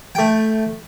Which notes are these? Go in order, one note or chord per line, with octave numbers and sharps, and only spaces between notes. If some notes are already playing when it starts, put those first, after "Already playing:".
A3 G5